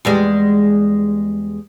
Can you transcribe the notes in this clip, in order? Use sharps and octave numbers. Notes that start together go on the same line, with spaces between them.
E2 G3 G#3